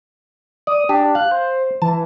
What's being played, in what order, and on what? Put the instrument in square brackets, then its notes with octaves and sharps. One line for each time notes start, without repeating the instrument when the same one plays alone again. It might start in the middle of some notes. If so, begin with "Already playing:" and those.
[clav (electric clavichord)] D5 [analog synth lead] D#6
[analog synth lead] D4 [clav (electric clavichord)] G4
[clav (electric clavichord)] F5 [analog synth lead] F#6
[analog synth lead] C5
[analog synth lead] E3 [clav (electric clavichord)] A5